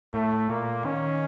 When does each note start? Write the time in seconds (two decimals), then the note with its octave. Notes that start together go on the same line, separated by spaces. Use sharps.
0.14 A2 A3
0.49 A#2 A#3
0.85 D#3 C#4